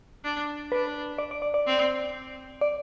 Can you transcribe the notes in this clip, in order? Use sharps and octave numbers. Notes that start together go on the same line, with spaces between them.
D4
D4 B4
D5
D5
D5
D5
C4
D5